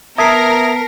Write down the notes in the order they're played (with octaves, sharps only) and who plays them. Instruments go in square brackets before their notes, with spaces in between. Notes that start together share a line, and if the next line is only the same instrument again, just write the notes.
[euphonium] B3 [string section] A#4 [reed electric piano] E5 D#6 G#6 [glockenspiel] A5 B6 C7